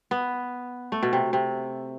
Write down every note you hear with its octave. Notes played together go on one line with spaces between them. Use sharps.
B3
A3
B2
C3
C3